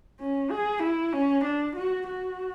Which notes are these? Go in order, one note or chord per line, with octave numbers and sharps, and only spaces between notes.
C#4
G#4
E4
C#4
D4
F#4
F#4